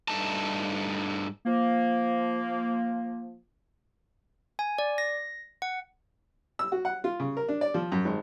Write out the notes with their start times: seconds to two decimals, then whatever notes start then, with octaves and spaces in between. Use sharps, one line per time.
0.08 G2 A3 D#4 A5
1.46 F3 A#3
4.59 G#5
4.78 D5
4.98 A#6
5.62 F#5
6.59 E6
6.72 F#4
6.85 F#5
7.04 F4
7.20 C#3
7.37 A#4
7.48 D4
7.61 D5
7.74 F3
7.92 F#2
8.05 G#1